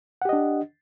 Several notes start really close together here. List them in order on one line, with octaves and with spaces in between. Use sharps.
F#5 G4 D#5 D4